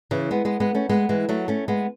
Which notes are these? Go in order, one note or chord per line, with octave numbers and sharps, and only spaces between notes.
C#3 E3
G#3 B3
G#3 B3
G#3 B3
A3 C#4
G#3 B3
E3 G#3
F#3 A3
A3 C#4
G#3 B3